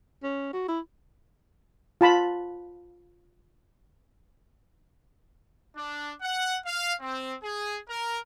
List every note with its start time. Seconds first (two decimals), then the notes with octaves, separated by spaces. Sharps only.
0.23 C#4
0.53 F#4
0.68 E4
2.01 F4 A5 B5
5.75 D4
6.21 F#5
6.65 F5
7.01 C4
7.43 G#4
7.88 A#4